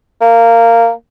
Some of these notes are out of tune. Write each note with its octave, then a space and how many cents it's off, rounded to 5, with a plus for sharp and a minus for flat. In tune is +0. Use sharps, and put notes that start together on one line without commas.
A#3 -15